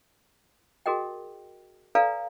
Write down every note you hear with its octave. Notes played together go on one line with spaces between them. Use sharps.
F#4 G#4 A#4 D#5 G5
A4 B4 D5 F5 G#5 A#5